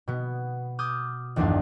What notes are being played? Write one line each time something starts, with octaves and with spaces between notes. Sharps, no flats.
B2 B3
D6 D#6 F6 G6 G#6
D#1 A#1 E2 G2 D4 F5